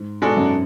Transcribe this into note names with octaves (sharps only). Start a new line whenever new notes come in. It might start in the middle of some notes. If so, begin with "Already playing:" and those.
Already playing: G#2
G#2 B2 G#3 D4 F#4 A4
F#2